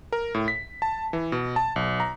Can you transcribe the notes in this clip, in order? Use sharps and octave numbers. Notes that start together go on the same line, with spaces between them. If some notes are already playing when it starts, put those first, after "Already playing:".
A#4
A2
B6
A5
E3
B2
A5
B1
A#5